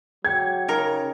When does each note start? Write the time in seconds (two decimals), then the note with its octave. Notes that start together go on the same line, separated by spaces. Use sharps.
0.25 F#3 G#4 G5 G#6
0.68 C#3 D#4 A#4